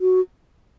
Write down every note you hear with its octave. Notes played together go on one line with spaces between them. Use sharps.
F#4